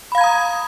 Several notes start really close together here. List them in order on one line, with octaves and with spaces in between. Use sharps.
B5 F5 G#6 A#5 D#6